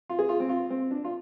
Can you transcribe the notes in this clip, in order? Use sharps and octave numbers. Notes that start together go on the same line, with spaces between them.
F4
G#4
F4
C4
F4
C4
D4
F4